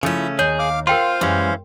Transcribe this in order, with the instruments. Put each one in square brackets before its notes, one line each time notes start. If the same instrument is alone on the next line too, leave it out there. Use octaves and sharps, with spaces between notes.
[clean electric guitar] C#3 A3 C#4 [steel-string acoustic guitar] F3 E4
[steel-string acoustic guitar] D#2 [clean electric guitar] G#4 [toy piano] C#5
[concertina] F5 D6 F6
[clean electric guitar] F4 [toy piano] A#4 G5 C6 [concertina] C5 F5
[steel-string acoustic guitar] F#2 G3 G#3 [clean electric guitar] E3 C#4